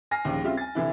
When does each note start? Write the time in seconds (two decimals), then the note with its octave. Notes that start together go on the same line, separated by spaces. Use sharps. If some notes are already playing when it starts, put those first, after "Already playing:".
0.11 G#5 F6 A#6 C7
0.25 A#1 D#2 C#3
0.43 C#3 G3 C4 F4 E5
0.57 G#5 A6
0.75 C2 D3 E3 E4